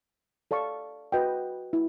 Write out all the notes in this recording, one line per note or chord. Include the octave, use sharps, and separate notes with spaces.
A4 D5 F5 A5 C#6
F#4 B4 D#5 G5
E4